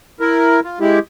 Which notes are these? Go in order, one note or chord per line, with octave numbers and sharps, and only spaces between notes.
E4 A#4
F4
G#3 E4 G4